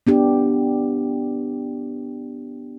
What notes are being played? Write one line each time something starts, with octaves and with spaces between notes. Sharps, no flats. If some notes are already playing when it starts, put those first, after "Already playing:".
B3 D4 G4